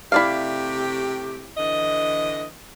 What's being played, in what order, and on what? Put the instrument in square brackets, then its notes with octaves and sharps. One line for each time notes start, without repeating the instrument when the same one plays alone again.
[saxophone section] C3 A3 G4 [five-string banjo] E4 D5 F5
[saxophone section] D3 E3 D#5